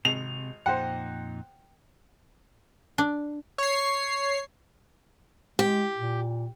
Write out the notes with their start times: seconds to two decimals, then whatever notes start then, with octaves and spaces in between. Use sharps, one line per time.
0.05 G#1 C3 F7
0.66 F2 A#2 D#4 C5 F#5 G5
2.98 D4
3.58 C#5 C7
5.59 G#3 G4
5.97 A#2